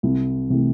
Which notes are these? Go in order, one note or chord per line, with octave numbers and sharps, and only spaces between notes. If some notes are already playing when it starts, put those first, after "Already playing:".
C2
C3 E3 A3